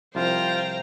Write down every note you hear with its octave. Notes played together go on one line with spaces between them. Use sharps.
C2 F3 F4 C5 F5 G5 A#5